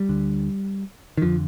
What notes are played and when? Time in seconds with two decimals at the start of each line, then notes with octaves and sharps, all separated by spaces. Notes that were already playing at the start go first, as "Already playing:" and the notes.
Already playing: G3
0.09 D2 D3
1.17 D#3
1.22 F2 D3 F3